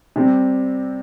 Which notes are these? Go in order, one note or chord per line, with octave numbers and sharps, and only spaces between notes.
C3 G3 C4